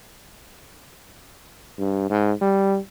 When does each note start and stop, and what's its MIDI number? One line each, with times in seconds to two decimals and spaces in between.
1.78 2.09 43
2.10 2.32 44
2.42 2.78 55